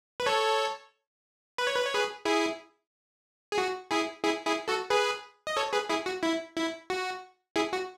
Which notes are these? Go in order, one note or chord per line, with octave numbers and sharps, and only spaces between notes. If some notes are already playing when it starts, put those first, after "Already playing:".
B4
A4 C#5
B4
C#5
B4
C#5
G#4 B4
E4 G#4
G#4
F#4
E4 G#4
E4 G#4
E4 G#4
F#4 A4
G#4 B4
D#5
A4 C#5
G#4 B4
E4 G#4
F#4
E4
E4
F#4
E4 G#4
F#4